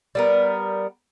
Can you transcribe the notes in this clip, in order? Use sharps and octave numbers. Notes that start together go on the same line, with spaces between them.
G3 B3 A#4